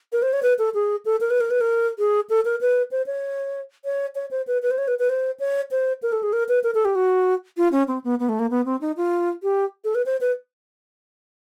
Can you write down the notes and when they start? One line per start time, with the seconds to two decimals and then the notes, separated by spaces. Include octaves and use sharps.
0.13 A#4
0.22 C5
0.33 C#5
0.43 B4
0.59 A4
0.74 G#4
1.05 A4
1.21 A#4
1.30 B4
1.41 A#4
1.51 B4
1.61 A#4
1.99 G#4
2.30 A4
2.45 A#4
2.61 B4
2.91 C5
3.06 C#5
3.85 C#5
4.15 C#5
4.31 C5
4.47 B4
4.62 B4
4.71 C5
4.78 C#5
4.88 B4
4.99 B4
5.09 C5
5.40 C#5
5.71 C5
6.03 A#4
6.12 A4
6.23 G#4
6.33 A#4
6.49 B4
6.64 A#4
6.75 A4
6.85 G4
6.95 F#4
7.57 F4
7.72 C#4
7.88 C4
8.04 B3
8.20 B3
8.29 A3
8.39 A#3
8.51 B3
8.65 C4
8.81 D#4
8.97 F4
9.43 G4
9.84 A4
9.95 B4
10.06 C5
10.21 B4